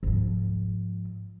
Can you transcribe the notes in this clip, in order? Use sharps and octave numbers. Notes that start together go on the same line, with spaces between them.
G#2 F3